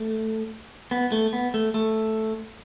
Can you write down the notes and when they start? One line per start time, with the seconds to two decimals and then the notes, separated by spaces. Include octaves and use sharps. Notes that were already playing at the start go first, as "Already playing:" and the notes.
Already playing: A3
0.91 B3
1.12 A3
1.33 B3
1.54 A3
1.74 A3